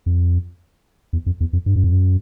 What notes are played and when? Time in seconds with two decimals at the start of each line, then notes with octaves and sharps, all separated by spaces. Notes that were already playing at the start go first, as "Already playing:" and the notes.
0.06 F2
1.13 E2
1.26 F2
1.40 E2
1.53 F2
1.66 G2
1.76 F#2
1.84 F2
1.92 F#2